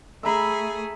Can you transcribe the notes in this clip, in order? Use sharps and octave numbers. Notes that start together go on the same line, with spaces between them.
A3 G#4 E5 A#5 B5